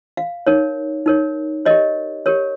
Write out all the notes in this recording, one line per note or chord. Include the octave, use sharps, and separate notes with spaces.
F5
D#4 A#4 C#5
D#4 A#4 C#5
G4 A#4 C#5 D#5
G4 A#4 C#5